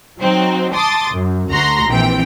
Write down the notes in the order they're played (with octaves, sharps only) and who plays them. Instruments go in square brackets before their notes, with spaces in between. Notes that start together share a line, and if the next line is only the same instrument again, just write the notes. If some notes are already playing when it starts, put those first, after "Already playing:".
[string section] F#3 C4 D#4
A5 C6 D6 D#6 A6
F#2
D2 A3 F#4 A#5 C6 A#6
A#1 E3 C4 G5